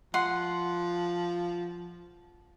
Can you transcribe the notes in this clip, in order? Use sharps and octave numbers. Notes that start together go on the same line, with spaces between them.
F3 F#5 C6